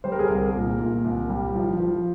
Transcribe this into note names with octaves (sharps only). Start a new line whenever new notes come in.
G3 C5
A#4
G#4
C2 A#4
A#2
A#2
C2
G3
F3
F3